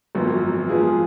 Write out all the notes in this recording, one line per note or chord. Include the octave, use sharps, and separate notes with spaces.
G#1 F#2 F3 B3
G#2 F3 B3 F4 G#4